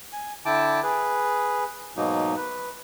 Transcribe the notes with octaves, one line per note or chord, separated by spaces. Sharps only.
G#5
D3 E4 G5 A5 D6
G#4 B4
G#2 B2 F#3 A#3 D#4
B4